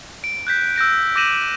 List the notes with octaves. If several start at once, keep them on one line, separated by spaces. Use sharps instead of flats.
D7
F#6 G6 B6
E6 G6 A#6 D7
D6 G6 A#6 D#7 E7 F#7